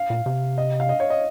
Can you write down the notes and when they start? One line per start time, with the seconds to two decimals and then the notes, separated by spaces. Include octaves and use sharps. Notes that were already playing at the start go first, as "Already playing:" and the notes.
Already playing: F5
0.10 A#2
0.26 C3
0.58 D#5
0.80 F5
0.89 D#5
1.00 C#5
1.10 D#5